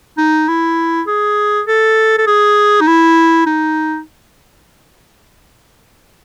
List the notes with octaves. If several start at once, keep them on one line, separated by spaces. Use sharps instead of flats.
D#4
E4
G#4
A4
A4
G#4
D#4
E4
D#4